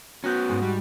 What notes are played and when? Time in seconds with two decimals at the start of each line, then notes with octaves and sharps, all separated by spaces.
0.24 B3 C#4 F#4 A#5 F#6 G6
0.49 G#2 G#3
0.62 G3